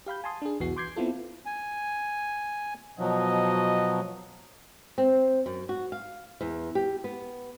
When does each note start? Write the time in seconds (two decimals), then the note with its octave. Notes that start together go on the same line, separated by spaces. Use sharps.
0.06 G4 F5 B5 G6
0.24 G#5 A5 C6 D#6
0.42 D4 G#4
0.60 B1 E2 E3 B3 F#4 C7
0.76 C6 D6 G6 G#6 C7
0.96 B3 C4 E4 F4 A4
1.46 G#5
2.99 B2 F3 F#3 D#5
4.98 C4
5.46 F#2
5.69 F#4
5.92 F5
6.41 E2
6.75 G4
7.04 B3